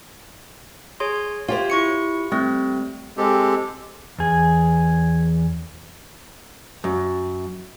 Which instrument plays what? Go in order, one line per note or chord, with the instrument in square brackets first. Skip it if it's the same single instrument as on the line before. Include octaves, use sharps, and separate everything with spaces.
[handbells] G#4 C#5 C6
[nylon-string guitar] F4 G4 C5 [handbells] C#5
[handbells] E4 C#6 C#7
[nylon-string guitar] G3 [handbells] A3 C4
[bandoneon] G#3 C4 G4 A4
[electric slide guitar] E2 G#4
[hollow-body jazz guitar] F#2